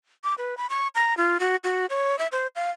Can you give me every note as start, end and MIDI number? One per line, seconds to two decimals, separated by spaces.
0.24 0.34 86
0.38 0.57 71
0.57 0.67 83
0.70 0.88 85
0.95 1.16 82
1.17 1.38 65
1.40 1.56 66
1.64 1.86 66
1.90 2.18 73
2.19 2.27 76
2.32 2.47 72
2.56 2.71 77